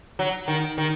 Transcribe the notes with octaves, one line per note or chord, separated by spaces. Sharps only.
F#3
D#3
D#3